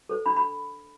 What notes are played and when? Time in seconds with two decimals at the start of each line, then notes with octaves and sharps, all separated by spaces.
0.09 A4 C5
0.26 D4 B5
0.36 B5